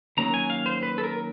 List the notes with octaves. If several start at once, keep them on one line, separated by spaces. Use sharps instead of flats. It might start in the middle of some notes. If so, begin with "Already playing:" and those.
D#3 F#3 A#3 C#4 A#5
G#5
F5
C5
B4
A4
A#4